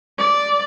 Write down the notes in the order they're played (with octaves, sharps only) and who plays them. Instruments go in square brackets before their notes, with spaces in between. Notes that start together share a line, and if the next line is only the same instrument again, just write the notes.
[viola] D5